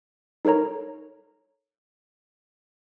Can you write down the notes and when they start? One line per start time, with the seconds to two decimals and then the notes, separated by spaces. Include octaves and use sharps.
0.45 D#4 A4 A#4 C#5 A#5